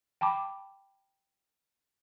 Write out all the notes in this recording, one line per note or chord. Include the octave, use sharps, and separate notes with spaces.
G5 A5 B5 D6